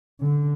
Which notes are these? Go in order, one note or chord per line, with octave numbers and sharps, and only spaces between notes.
D3